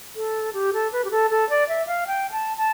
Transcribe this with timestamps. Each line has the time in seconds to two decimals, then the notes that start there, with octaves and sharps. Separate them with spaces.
0.16 A4
0.54 G4
0.74 A4
0.92 B4
1.05 G4
1.11 A4
1.31 A4
1.50 D5
1.69 E5
1.87 F5
2.07 G5
2.32 A5
2.57 A5